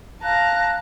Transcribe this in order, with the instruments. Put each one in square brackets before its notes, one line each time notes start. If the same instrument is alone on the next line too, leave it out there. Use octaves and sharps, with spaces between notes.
[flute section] F5 F#6 [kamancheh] A5 A#5